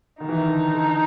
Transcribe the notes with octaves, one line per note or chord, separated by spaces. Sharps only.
D#3 D#4
E3
D#3
D3
D3